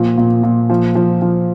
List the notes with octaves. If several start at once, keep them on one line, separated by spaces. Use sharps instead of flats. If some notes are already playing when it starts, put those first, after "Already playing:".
Already playing: A#2 F3
A#2
A#2
F3
F3
F3